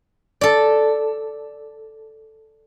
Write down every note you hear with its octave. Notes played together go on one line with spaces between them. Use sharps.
A4 D5